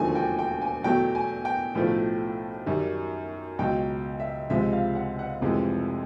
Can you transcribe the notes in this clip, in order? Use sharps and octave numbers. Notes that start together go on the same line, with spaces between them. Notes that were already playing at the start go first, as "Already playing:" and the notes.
Already playing: E1 D#2 D3 F3 A3 G#5
G5
G5
G#5
E2 B2 F#3 A3 G5
G#5
G5
B1 A2 F3 A3
F#2 D#3 G3
C#2 B2 F#3 G5
E5
C#2 C3 F3 G#3 E5
F5
F#5
F#5
F1 F2 C3 E3 G#3